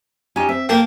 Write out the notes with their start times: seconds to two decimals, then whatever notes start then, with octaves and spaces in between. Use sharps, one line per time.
0.36 C#4 D#4 G4
0.49 C4 E5
0.69 A#3 A4 G5 A5